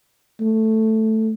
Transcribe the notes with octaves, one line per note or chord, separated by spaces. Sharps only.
A3